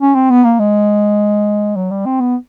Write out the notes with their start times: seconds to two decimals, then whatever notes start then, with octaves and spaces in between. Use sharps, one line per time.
0.01 C#4
0.15 C4
0.30 B3
0.44 A#3
0.59 G#3
1.76 F#3
1.91 G3
2.05 C4
2.20 B3